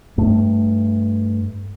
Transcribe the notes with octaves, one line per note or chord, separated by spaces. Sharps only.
G2 A3